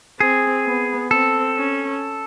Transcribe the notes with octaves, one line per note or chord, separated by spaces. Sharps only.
C4 G#4
B3
C4 A4
C#4